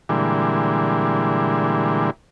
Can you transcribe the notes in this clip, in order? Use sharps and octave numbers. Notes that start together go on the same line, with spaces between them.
A#2 D3 E3 G3 G#3